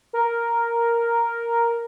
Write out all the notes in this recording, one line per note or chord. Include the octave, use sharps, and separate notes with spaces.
A#4